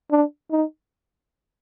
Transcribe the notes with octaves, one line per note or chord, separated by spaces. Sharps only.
D4
D#4